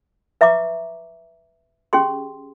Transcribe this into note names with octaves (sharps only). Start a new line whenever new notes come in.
B4 E5 A#5 C#6 D6
C#4 G4 G#4 C6